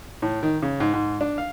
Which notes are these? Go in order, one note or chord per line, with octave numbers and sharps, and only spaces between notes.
A2
D#3
C#3
G#2
G#2
D4
F5